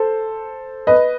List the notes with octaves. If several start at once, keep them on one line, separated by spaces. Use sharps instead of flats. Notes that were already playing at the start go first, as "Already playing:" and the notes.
Already playing: A4 C5
B4 D#5